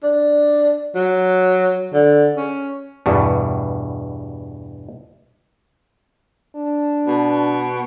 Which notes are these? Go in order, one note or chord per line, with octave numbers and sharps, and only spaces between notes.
D4
F#3
D3
C#4
E2 G2 B2
D4
B2